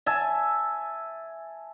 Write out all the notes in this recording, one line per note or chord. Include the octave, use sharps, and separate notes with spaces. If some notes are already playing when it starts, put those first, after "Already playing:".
E5 G#5 A5